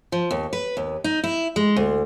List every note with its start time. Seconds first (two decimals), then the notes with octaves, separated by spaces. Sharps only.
0.12 F3
0.31 D#2
0.53 B4
0.77 D#2
1.04 D#4
1.24 E4
1.56 G#3
1.76 D2